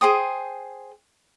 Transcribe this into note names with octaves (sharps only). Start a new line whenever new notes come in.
G#4 C5 G5 D#6